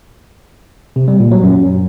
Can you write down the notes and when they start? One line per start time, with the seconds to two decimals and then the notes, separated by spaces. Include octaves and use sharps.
0.96 C3
1.08 G3
1.20 A#2
1.31 F#3
1.43 F#2